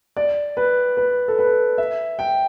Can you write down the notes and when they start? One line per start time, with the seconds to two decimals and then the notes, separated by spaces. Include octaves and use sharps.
0.17 D5
0.57 B4
0.97 B4
1.28 A4
1.39 B4
1.78 E5
2.19 G5